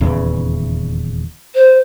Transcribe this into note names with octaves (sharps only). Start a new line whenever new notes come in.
D#1 E2 C#3
C5